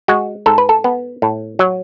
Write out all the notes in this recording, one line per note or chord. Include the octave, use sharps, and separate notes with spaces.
G#3 F#4
G#2 A4
B4
A4
B3
A2
F#3